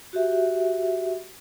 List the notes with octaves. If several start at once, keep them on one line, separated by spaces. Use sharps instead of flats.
F#4 G4 E5